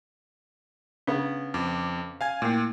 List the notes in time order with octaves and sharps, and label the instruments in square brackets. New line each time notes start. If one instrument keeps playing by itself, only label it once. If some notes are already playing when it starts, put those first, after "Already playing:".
[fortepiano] C#3 B3 [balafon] D4
[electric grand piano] F2 D6
F5 G#5 G#6
[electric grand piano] A#2 [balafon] A3 A#3 E4